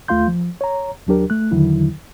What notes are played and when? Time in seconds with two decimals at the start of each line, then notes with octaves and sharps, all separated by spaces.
0.08 D#2 A3 F4 F5 C6 G6
0.28 F3
0.61 C#5 A#5
1.07 D#2 F#3 D4 G4 A#4
1.30 A3 F#6
1.51 E2 D3 D#3 F#3 E4